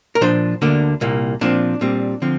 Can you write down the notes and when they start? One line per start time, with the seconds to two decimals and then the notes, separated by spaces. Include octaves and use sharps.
0.15 A#4
0.21 A#2 F3 D4 C5
0.62 D2 D3 A#3 D4
1.01 C2 A#2 A#3
1.41 A#2 F3 C4 D4
1.81 A#2 G3 C4
2.22 D3 F3 C4